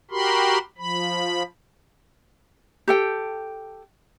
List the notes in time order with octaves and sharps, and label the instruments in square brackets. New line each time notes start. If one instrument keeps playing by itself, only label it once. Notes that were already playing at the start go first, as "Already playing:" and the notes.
[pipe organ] F#4 G4 A#4 B5 C6
F3 B5
[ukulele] G4 A4 G5